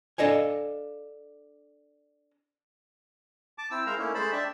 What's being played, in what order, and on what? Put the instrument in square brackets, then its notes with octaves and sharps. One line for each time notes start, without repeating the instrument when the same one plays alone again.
[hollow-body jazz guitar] D4 A4 D#5 F5 G#5
[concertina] A5 D6
C4 E4 E6
G#3 E4 A#4 C5 F5 A#5
A3 A#3 C#4 D#4 E4
G#3 A3 C5 A5 B5
D4 D5 E5 G5 A5